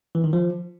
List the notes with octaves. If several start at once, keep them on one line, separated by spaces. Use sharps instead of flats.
E3
D#3
F3